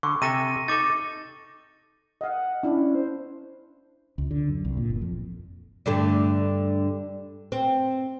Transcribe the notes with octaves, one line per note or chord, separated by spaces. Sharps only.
D3 C#6
C3 A4 G#5 A#6 D#7
D#4 A4 D6 A6
D#5 F5 F#5
C#4 D4 E4
C5
C#2
D3
F#2
C2
A#2
G1
F2
G2 D3 A3
C4